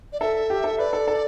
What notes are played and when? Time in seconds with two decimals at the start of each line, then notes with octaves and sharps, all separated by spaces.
0.13 D5
0.20 A4 E5
0.50 G4
0.64 A4
0.78 B4 D5
0.93 A4
1.07 A4